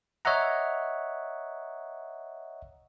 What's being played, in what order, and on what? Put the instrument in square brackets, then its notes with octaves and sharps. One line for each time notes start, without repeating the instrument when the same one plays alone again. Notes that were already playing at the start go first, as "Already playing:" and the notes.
[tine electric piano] C#5 D#5 E5 F#5 A#5